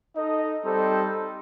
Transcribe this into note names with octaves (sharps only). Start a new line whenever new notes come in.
D#4 A4 D#5
G3 C4 D#4 A4 C5